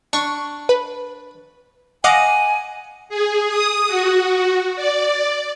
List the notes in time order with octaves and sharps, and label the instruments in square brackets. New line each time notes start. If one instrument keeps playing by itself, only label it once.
[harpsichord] D4 [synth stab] C#6
[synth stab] B4
[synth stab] D#5 F5 D6 [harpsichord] F#5 [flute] G#5
[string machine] G#4
D#6
F#4
D5